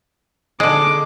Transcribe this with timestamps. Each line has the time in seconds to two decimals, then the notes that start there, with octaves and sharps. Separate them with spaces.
0.60 D3 G#3 D6